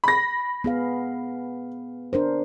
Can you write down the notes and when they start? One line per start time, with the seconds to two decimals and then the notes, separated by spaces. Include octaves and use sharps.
0.04 B5 A#6
0.64 B3 G#4 F5
2.13 D4 A#4 C5